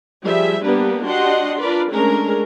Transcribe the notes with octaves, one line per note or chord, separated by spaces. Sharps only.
F3 G3 G#4 E5
G3 A#3 B3 D4 G4 B4
D4 F#4 G4 D#5 F#5 C6
D4 F4 A#4 B4 D5
G#3 A3 C#4 D4 G#4 A#4